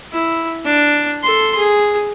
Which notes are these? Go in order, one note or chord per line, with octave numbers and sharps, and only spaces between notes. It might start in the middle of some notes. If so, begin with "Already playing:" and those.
E4
D4
A4 C6
G#4